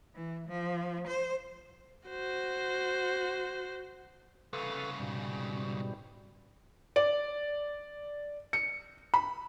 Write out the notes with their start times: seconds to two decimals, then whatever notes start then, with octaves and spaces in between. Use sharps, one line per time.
0.15 E3
0.48 F3
1.07 C5
2.09 F#4 C5
4.53 C2 C#3 A4 B4 F5
5.00 G#2 B2 G3
6.96 D5
8.53 C#7
9.14 B5